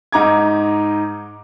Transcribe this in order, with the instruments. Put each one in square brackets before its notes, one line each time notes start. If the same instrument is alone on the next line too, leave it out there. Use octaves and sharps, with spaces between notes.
[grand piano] G#2 D#4 A#5 D6 G#6